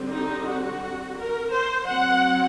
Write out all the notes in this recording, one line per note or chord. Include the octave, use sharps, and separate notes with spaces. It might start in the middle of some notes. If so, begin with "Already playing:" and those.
Already playing: D3 G3 C4
D#4
F#4
A#4
C5
F#3 C4 F#5